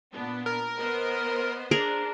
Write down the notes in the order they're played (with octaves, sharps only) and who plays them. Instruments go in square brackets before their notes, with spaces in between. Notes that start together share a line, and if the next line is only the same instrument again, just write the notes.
[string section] A#2 B3 D4
[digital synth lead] A#4
[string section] B3 C5 D#5
[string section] D4 C5 [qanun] G#4 A#4